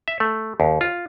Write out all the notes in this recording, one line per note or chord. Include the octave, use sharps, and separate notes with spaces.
E5
A3
D#2
F4